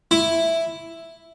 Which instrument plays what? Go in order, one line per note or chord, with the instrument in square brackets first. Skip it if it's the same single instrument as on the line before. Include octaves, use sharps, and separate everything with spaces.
[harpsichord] E4